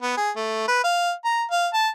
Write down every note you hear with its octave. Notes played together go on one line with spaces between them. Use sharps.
B3
G#4
A3
B4
F5
A#5
F5
A5